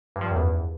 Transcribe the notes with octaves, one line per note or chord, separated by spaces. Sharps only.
G2
F3
G2
F#2
E2